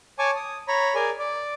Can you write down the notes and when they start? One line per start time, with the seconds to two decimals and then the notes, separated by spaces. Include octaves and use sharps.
0.19 C#5 G#5 A5 C#6 D6
0.36 D#6
0.68 C#5 A#5 B5
0.95 G#4 A#4 D5 G#5
1.19 D5